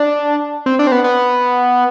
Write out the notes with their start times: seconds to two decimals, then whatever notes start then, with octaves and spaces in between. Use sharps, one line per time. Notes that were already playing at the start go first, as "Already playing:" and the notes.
Already playing: D4
0.66 C4
0.79 D4
0.87 C4
0.92 B3
1.04 B3